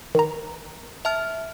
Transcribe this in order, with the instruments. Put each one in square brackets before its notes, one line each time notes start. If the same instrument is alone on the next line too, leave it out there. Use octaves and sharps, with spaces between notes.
[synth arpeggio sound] D#3 A#5
[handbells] E5 A5 F6